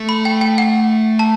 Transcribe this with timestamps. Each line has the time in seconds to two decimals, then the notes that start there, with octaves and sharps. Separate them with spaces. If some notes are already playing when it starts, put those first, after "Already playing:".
Already playing: A3
0.09 B5
0.25 G5
0.41 G5
0.58 F#5
1.19 A5